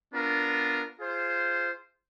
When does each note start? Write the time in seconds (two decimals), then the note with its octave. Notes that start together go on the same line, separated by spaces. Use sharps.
0.12 B3 D4 F4 A#4
0.99 F4 G#4 C5